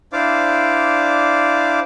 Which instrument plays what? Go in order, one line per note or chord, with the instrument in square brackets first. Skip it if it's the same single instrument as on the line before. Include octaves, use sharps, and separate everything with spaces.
[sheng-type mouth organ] D4 E4 C5 D5 F5 D6